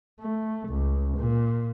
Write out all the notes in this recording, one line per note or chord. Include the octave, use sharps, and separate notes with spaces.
A3
C#2
A#2